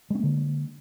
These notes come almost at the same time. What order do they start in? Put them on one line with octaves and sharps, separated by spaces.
G#3 C#4 A#3 D3